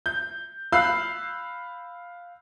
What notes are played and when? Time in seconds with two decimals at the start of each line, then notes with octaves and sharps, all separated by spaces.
0.06 G6
0.72 F5 B5 E6 F#6 G6 C7